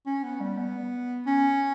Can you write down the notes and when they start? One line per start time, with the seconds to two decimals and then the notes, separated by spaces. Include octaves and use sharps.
0.06 C#4
0.24 B3
0.40 G3
0.58 B3
1.27 C#4